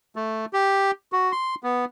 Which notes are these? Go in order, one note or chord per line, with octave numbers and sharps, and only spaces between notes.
A3
G4
F#4
C6
B3